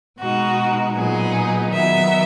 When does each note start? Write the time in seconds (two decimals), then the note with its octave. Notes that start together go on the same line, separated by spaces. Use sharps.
0.19 B2 G#3 D#4 F#4
0.95 A#2 F#3 B3 D#4 G#4
1.72 D#3 F#3 B3 E5